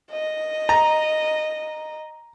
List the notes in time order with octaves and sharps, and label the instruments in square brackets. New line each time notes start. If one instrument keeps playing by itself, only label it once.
[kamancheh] D#5
[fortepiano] A#5